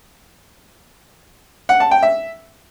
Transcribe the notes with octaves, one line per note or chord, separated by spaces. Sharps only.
F#5
A5
G5
E5